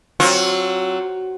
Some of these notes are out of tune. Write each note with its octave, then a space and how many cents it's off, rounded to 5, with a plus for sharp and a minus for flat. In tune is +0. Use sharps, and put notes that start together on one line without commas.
F#3 +15 C4 +25 F4 +35